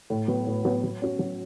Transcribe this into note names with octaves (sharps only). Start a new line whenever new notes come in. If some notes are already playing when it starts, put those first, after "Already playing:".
A2
F#3 B3
A2
F#3 B3
F#3
C#4 F#4
F#3